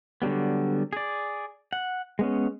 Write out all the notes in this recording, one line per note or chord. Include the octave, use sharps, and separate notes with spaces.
D3 F#3 G3 B3
G#4 D5
F#5
G#3 B3 C#4